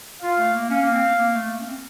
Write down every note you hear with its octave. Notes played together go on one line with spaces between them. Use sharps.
F4 F5
A3
A#3
C#4 F5
A#3
C4
A#3
A3
A#3
C#4
C4